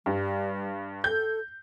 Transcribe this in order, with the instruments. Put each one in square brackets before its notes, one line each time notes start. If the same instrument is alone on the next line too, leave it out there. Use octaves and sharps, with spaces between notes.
[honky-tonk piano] G2 [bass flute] G3
[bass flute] A4 [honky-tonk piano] G6